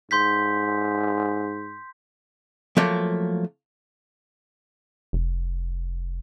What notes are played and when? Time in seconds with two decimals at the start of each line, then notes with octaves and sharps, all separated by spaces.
0.11 G#2 C6 G6 B6
2.77 F3 F#3 A3 A#3
5.13 F1